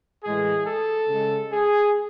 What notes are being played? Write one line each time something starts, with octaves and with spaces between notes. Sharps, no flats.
A2 E3 G#3 G#4
A4
C#3 G#3
G#4